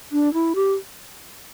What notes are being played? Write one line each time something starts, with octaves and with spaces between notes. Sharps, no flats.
D4
E4
G4